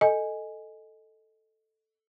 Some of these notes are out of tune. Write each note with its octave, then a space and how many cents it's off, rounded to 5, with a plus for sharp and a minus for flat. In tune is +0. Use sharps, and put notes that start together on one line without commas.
A4 +0 D#5 +0 G#5 +0